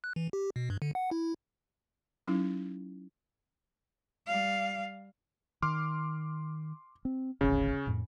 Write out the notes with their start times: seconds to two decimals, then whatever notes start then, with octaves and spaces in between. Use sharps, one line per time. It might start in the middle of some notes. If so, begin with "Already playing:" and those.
0.04 F#6
0.16 E3
0.33 G4
0.56 B2
0.70 G2
0.82 D3
0.95 F#5
1.11 E4
2.28 F#3 C#4 D#4 E4
4.27 G3 F5
5.62 D#3 C6 D6 F6
7.05 C4
7.41 D#1 G#1 D2 C#3 C#4
7.87 F2 A2